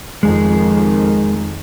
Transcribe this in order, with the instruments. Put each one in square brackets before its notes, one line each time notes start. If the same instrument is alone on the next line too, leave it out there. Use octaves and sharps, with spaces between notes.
[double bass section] F2 D#3 [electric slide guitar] G#3 G#4